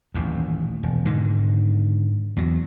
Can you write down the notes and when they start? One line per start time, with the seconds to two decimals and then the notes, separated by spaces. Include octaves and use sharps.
0.14 D#1 A1 D#2
0.83 E1
1.05 G#2 D3 D#3
2.37 E2 F#3